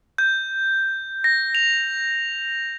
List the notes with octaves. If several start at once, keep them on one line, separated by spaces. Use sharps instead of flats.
G6
A#6
F7